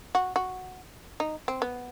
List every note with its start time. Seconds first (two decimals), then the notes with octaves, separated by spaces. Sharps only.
0.15 F#4
0.36 F#4
1.20 D#4
1.48 C4
1.62 B3